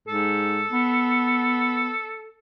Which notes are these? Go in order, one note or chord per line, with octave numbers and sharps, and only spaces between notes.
G#2 A4
B3